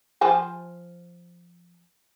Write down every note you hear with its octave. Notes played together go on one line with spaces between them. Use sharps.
F3 C5 G#5